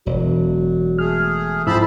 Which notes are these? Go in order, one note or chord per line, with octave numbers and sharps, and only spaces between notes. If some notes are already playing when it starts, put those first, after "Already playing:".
E1 F#3
A3 G#4 F6
F2 G#2 E4 C5 A5 B5 E6